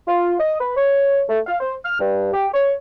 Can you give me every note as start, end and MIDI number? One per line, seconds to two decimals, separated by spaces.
0.08 0.34 65
0.39 0.55 75
0.60 0.75 71
0.77 1.23 73
1.29 1.40 57
1.47 1.56 77
1.60 1.75 72
1.84 1.97 89
1.99 2.30 43
2.33 2.48 67
2.54 2.73 73